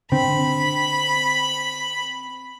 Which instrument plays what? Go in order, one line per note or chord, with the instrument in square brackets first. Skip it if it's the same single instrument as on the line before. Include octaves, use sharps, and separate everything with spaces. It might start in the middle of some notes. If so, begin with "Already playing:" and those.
[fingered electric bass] D3 [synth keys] C4 [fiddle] B5